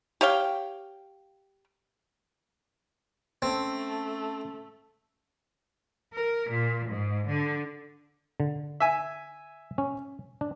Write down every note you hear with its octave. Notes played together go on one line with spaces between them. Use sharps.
G4 C#5 F5 G5
A3 C4 C#4 A5
A#4
A#2
G#2
D3
D3
E5 G#5
C#4
D4